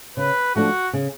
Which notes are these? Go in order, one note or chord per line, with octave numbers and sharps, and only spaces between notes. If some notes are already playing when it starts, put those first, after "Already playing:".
C#3 B4
F3 A3 D4 F#4
C#3